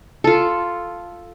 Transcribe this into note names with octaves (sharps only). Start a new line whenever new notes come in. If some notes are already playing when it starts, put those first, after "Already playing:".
F4 A4